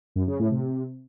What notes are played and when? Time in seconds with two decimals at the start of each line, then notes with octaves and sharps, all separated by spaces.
0.16 F#2
0.27 C#3
0.39 A2
0.51 C3